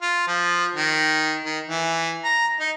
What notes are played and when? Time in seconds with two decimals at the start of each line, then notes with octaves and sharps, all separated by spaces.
0.02 F4
0.27 F3
0.75 D#3
1.45 D#3
1.67 E3
2.24 A#5
2.60 D#4